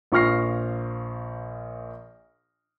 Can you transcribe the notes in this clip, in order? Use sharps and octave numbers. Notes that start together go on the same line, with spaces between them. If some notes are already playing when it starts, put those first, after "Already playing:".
A#1 F3 C#6 F6 A#6 C7